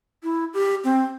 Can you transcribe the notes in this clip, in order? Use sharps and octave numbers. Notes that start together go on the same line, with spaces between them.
E4
G4
C4